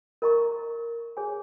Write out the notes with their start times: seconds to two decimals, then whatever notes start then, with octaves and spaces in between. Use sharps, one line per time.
0.22 A#4 D#5 A#5 C#6
1.17 G#4 C#5 G#5